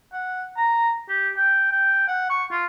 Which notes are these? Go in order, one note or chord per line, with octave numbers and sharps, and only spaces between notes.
F#5
A#5
G4
G5
G5
F#5
C#6
F4